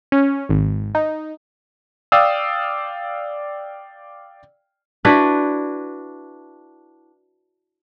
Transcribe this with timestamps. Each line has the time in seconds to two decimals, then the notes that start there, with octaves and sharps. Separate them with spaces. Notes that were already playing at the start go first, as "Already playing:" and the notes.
0.12 C#4
0.49 G#1
0.95 D#4
2.12 D5 F5 G5 D#6 E6
5.05 D4 E4 F#4 B4